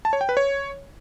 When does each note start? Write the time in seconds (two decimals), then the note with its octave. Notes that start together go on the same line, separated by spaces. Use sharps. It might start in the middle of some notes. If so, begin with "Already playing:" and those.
0.05 A5
0.13 C#5
0.21 G5
0.29 B4
0.37 C#5